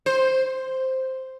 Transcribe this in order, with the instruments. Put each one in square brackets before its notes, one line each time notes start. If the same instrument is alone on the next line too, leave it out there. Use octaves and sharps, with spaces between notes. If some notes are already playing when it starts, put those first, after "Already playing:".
[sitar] C5